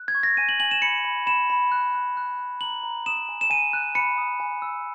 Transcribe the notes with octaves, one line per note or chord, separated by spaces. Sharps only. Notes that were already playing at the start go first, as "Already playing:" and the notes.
Already playing: F#6
G#6
C#6
A#6
G#5 D#7
F#7
G#5 F#7
E7
B5 C#7
B5
B5 E7
B5
F#6
F#6
F#6
F#6
A#5 F#7
A#5
D#6 E7
G#5
E7
G#5 D#7
F#6
B5 C#7
D#6
G#5
E6